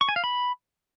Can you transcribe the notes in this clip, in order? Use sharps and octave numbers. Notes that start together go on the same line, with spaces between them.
C#6
G#5
F5
B5